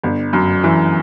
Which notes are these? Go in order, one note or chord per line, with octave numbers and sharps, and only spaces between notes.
G1
F#2
E3